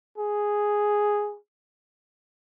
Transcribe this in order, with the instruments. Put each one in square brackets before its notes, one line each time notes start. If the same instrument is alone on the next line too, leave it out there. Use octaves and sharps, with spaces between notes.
[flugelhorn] G#4